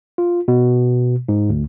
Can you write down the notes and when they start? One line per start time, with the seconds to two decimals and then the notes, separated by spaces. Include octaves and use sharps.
0.18 F4
0.48 B2
1.29 G#2
1.50 D2